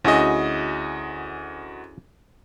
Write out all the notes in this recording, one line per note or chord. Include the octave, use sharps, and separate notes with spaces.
D2 C#4 E4 F#4 G#4 D#5